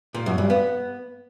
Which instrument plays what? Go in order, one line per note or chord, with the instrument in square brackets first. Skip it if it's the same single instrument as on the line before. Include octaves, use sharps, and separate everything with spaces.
[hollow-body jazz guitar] A#2
F#2
G2
B3